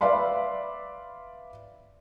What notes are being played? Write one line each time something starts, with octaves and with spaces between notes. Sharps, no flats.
B4 D5 E5 F5 B5 C6